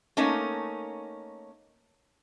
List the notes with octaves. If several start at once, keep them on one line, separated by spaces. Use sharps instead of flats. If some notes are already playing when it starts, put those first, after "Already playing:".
A3 A#3 C#4 D#4